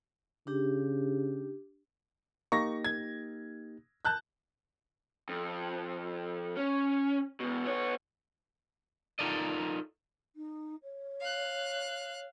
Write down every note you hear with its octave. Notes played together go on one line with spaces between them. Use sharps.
C#3 D4 G4
A#3 D#4 G4 C#6 A#6
G#6
A5 F#6 G6
F2
C#4
E2 B2
B3 C#5
D#4 F4 A4 A#4 D5 D#5
D#4
C#5
F5 F#6